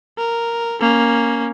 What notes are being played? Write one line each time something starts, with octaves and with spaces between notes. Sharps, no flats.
A#4
A#3 C#4